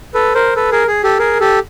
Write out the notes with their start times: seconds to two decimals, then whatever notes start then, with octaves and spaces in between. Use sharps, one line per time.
0.14 A4 B4
0.35 A#4 C5
0.56 A4 B4
0.72 G#4 A#4
0.87 G#4
1.03 G4 A4
1.19 G#4 A#4
1.40 G4 A4